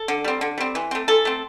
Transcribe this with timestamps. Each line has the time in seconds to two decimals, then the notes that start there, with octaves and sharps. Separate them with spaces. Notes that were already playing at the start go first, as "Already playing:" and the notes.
Already playing: A4
0.08 D3
0.24 G3 C4
0.41 D3
0.58 G3 C4
0.75 E3
0.91 A3 C4
1.08 E3 A4
1.25 A3 C4